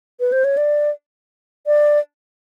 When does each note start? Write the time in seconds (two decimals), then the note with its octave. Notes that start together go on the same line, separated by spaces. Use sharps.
0.20 B4
0.32 C5
0.44 C#5
0.57 D5
1.66 D5